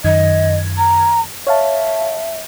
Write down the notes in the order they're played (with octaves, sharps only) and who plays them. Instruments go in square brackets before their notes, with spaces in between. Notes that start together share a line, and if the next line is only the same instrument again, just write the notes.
[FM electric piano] F#2 D#3 G#6 [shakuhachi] D#5
[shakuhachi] A#5
[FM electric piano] C#5 F5 A5 [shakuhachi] E5